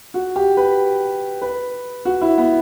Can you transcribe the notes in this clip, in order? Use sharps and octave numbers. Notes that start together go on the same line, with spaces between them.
F#4
G4
B4
B4
F#4
E4
B3